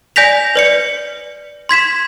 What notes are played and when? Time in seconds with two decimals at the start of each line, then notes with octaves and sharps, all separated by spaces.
0.16 D5 G#5 G6 A#6 B6 F7
0.55 B4 D5 C#7
1.69 C6 G#6 B6 E7